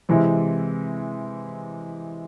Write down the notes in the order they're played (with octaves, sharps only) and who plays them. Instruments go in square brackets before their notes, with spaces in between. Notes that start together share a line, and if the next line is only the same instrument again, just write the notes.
[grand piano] C3 E3 G#3 C4 E4